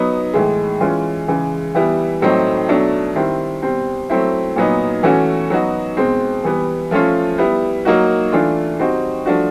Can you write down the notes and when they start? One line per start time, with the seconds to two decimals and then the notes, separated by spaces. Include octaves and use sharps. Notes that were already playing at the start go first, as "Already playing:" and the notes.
Already playing: F#3 B3 D#4
0.33 A2 E3 G#3
0.80 E3 G#3 C#4 F4
1.28 C#3 E3 G#3
1.75 E3 G3 B3 E4
2.22 A2 F#3 A3 C4 D#4
2.69 B2 F#3 A3 D4
3.15 D#3 G3 C4 E4
3.62 B2 G3 C4
4.10 F#3 A3 C4 E4
4.56 A#2 F#3 B3 D#4
5.03 E3 A3 C#4 F#4
5.50 F#3 B3 D#4 F#4
5.97 B2 G#3 C4
6.44 E3 G3 B3
6.91 F3 A3 C#4 F4
7.38 G3 B3 E4
7.85 F#3 A#3 D#4 F#4
8.32 E3 A3 D4 F4
8.79 G3 C4 D#4 F#4
9.26 F3 A3 D4 F#4